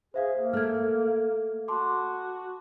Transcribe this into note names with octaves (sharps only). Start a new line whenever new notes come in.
G#4 C5 E5 F5
A#3
A3 F6 G#6
F#4 A5 C6 D6